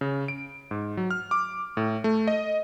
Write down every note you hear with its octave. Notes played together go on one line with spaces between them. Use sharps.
C#3
D7
G#2
F#3
F6
D6
A2
A3
D#5